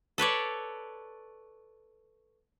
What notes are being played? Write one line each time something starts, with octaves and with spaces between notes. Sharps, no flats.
A4 B4 C#5 D5